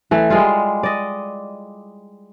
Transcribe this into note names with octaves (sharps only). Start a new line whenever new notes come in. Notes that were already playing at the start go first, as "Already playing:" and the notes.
E3 A3
G3 G#3 F4
D5 D#5